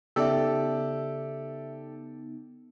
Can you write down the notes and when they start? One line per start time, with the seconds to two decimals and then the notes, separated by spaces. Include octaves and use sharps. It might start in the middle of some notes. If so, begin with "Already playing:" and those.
0.16 C#3 B3 D#4 G4 A4 D5 E5 E6